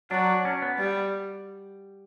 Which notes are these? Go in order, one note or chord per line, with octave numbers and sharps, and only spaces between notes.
F#3 D4
C#4
B3
G3